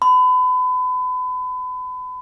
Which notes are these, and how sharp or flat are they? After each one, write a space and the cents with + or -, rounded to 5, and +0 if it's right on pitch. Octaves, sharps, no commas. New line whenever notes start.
B5 +35